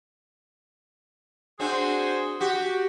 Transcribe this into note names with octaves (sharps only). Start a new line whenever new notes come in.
C4 D4 F#4 G#4 C5
F#4 G4